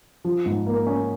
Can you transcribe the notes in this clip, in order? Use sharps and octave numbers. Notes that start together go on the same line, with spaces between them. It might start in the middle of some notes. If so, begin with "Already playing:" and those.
F3
G#2
A#3
C#4